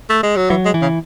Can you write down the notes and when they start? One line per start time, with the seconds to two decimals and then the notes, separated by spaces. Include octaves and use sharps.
0.10 A3
0.23 G#3
0.36 F#3
0.50 E3 F#3
0.66 G#3
0.74 E3
0.82 C#3